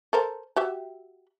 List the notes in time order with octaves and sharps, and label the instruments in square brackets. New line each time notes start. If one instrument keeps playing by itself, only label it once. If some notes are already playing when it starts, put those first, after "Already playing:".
[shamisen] A4 A#4 C5
F#4 G4 E5